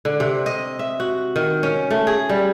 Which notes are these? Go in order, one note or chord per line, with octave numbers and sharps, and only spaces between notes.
D3
C3
D#5
E5
F#4
D#3
C#4
A3
G#4
G3